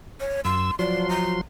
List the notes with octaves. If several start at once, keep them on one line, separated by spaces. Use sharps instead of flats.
C#5
F#2 C6 E6
F3 F#3 D5 C6
A#5